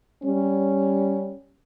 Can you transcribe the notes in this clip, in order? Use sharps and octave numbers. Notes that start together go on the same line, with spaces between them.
G3 C#4